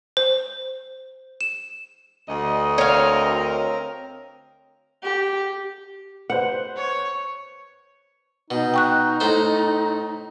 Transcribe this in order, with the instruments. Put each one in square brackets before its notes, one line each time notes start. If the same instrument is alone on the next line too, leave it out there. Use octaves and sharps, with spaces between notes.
[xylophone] C5
E7
[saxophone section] D2 D#5
[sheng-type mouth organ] C4 A#4 [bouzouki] C#5 F5
[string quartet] G4
[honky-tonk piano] B4 C5 [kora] F#5
[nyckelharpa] C#5
[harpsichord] B2 [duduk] D#4
[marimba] G5 C#6 F#6
[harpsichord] A2 A3 C5